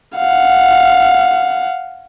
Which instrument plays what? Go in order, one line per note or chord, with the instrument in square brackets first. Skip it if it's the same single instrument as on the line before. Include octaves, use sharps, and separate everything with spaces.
[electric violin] F5 F#5